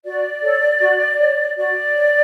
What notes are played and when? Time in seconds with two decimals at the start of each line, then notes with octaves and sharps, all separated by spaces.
0.04 F#4 D5
0.42 A4 C#5
0.80 F#4
1.19 C#5
1.57 F#4 D5
1.95 C#5